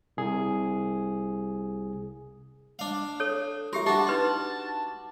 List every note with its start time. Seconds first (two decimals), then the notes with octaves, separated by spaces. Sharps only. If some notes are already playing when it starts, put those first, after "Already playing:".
0.17 C2 G#4
2.79 D4 F5
3.20 A4 C#5
3.73 F#4 G4 A#4 E5
3.86 D4 F#4 G4 A5
4.07 D#4 B4 C6